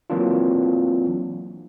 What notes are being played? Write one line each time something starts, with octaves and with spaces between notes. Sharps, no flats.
E3 F#3 A#3 C4 D4 F4